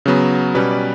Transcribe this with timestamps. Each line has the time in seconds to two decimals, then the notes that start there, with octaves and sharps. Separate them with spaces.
0.06 C#3 F#3 B3
0.54 B2 G3 C#4 B4
0.71 D5